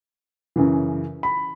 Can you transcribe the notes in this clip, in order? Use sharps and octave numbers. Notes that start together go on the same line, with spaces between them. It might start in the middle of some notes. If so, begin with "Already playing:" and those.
F#2 C#3 E3
B5